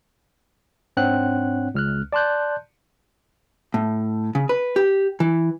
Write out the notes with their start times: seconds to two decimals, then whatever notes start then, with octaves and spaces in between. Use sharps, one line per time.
0.97 G#2 C4 D4 C#5 F#5 F#6
1.75 C#2 F6 F#6
2.12 D5 A5 C6 F#6 G6
3.74 A2
4.35 C#3
4.49 B4
4.76 G4
5.20 E3